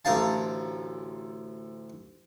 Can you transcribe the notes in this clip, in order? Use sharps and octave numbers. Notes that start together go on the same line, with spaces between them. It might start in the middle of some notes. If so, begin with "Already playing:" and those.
A1 D2 A#4 F5 A5